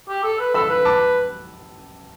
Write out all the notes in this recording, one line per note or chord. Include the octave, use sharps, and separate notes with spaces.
G4
A4
B4
A4 B5 E6
B4
A5 D6